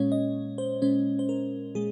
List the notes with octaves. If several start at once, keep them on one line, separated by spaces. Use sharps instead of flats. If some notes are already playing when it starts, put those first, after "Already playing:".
Already playing: A#2 G#3 C#4 C#5
D#5
C5
A#2 G#3 C#4 C5
C5
A#4
A#2 G#3 G#4